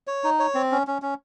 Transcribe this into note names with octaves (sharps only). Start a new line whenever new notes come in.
C#5
D#4
C#5
C4
C#4
C#4
C#4